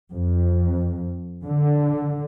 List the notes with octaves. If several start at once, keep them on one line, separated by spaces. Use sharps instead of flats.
F2
D3